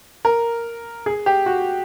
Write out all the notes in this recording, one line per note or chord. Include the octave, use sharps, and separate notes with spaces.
A#4
G#4
G4
F#4